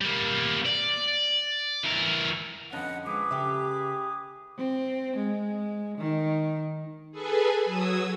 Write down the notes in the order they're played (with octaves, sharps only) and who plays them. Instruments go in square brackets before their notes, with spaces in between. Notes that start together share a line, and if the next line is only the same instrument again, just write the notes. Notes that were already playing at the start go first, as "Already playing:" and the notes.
[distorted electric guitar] G3 A#3
D5
E3 A#4
[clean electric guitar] F2 D3 C#4 [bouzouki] F3 [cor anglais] B4 [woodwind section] D#5 F#5
[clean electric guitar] G#3 [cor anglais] G#4 [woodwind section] B4 B5 D6
[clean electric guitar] C#3 A4 [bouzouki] G4 E5
[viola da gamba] C4
G#3
D#3
[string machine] G#4 A4 B4 G#5
F#3 D#6 E6 G#6